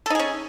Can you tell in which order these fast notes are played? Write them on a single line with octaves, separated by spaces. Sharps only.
A4 D#4 G#4 C#4